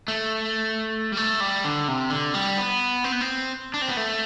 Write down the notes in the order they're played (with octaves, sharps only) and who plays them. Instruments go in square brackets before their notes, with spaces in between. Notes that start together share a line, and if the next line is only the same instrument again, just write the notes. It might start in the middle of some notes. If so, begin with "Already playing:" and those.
[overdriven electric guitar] A3
G3
A3
G3
D3
C3
D3
G3
B3
C4
B3
C4
D4
C4
B3
A3